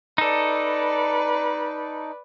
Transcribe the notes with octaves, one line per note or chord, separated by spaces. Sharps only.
D#4 A4 B4 D5